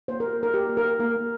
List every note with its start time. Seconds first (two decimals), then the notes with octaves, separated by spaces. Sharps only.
0.08 A#3 C5
0.20 A#4
0.24 G4
0.39 A#3 A#4
0.54 A#3 G4
0.69 A#3
0.77 A#4
0.85 A#3
1.00 A#3 A#4
1.16 A#3